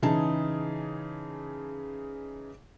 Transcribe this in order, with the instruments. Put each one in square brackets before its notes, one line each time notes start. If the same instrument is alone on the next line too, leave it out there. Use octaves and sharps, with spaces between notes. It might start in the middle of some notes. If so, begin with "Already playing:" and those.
[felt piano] C#3 E3 D#4 G#4 A5